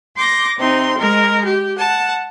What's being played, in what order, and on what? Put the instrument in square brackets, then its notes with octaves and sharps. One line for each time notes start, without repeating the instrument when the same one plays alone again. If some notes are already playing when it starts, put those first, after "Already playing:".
[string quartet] C6 D6 G6 A#6
C3 C4 D#4 C6
G#3 A#4
G4
F#5 A5